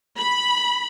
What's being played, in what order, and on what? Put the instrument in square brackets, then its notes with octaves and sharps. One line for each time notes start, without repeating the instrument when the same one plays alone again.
[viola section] B5